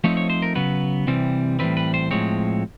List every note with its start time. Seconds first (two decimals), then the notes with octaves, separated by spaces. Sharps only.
0.04 F3 A3 C4 D#4 C#5
0.17 C#5
0.30 C5
0.42 A#4
0.55 C#3 F#3 B3 B4
1.07 C3 E3 G3 C4
1.59 A2 E3 G3 C4 B4
1.77 B4
1.94 C5
2.11 A2 F3 G#3 C4 C#5